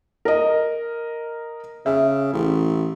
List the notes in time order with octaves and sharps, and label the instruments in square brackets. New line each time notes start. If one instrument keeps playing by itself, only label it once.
[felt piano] A#4 D#5
[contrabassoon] C#3 [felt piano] E5
[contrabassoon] A1